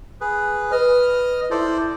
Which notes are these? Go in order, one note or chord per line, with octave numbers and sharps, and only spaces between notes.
G#4 B4
B4 D#5 F6
E4 A4 C5 D5